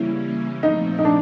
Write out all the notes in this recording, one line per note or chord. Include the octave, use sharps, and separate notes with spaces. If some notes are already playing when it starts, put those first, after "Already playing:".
Already playing: C#3 E3 G3 A#3 C#4 E4
A#2 F3 A3 C4 D#4
D#4
D4